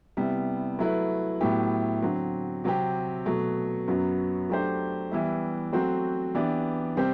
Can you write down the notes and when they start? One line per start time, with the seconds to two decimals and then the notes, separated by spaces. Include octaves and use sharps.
0.17 C3 G3 B3 E4
0.79 F#3 A3 E4 B4
1.41 A2 F#3 B3 E4 G4
2.02 D3 F#3 C4
2.64 C3 F#3 C4 G4
3.26 B2 F#3 A3
3.88 F#2 F#3 B3
4.49 F#3 A3 D4 G4 C5
5.11 E3 G3 B3 E4
5.73 F#3 A3 C4 F#4 C5
6.35 E3 B3 D4 G4 D5
6.96 C3 G3 C4 G4 C5